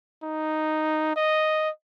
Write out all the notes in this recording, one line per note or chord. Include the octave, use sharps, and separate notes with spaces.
D#4
D#5